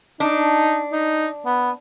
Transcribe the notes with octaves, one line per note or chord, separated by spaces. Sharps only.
D4 D#4
D#4
B3